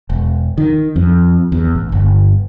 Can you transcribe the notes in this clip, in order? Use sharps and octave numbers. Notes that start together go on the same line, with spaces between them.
E1
D#3
F2
E2
A1
G1